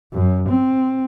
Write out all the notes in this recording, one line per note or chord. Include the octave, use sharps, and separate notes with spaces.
F#2
C4